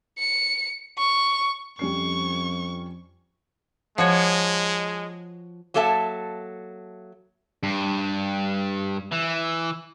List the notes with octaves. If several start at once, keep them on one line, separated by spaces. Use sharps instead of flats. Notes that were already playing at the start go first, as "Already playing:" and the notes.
C#7
C#6
F2 G3 C#4 C#6 C7
F3 G#3 F#4 C#5
F#3 A#3 A4 E5 A5
G2
E3